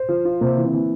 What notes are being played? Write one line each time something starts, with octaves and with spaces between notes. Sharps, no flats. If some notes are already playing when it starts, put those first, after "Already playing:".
Already playing: C5
F3
F4
C3 A#3
E3
C4
E3